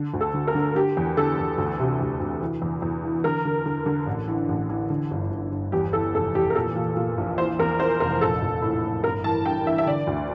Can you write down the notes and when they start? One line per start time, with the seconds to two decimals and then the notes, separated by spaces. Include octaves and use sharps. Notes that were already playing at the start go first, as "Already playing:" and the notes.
Already playing: D3
0.14 D2
0.21 A4
0.34 D3
0.48 A#4
0.55 D3
0.75 D3 G4
0.97 E2
1.17 D3 A4
1.38 E2
1.58 D2
1.80 C3
2.01 D2
2.20 D2
2.42 E3
2.62 E2
2.82 E2
3.04 E3
3.24 D3 A#4
3.45 D3
3.66 D3
3.86 D3
4.07 A1
4.28 E3
4.48 A1
4.69 E3
4.90 D3
5.11 G1
5.31 G1
5.52 G1
5.72 E2 G4
5.93 E3 A4
6.14 F1 A4
6.35 E2 G4
6.50 A#4
6.55 A#2 A4
6.76 A#2
6.96 A#2
7.18 A#1
7.38 E3 C5
7.59 E2 A#4
7.80 E3 C5
8.00 F1 A#4
8.21 A#1 A4
8.42 A#1
8.62 A2
8.84 A2
9.04 G1 A#4
9.24 E3 A5
9.45 G2 G5
9.66 E3 E5
9.78 E5
9.86 D3 D5
10.07 D2